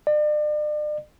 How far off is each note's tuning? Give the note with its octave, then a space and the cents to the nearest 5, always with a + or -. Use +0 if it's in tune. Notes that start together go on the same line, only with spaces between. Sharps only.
D5 +40